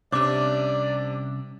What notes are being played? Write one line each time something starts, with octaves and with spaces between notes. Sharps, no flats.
C2 C3 C#4 D4 C#5 D5 E5 D6